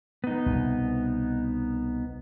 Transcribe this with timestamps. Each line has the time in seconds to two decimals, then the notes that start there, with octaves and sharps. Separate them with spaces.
0.24 B3 D#4
0.46 C2 B2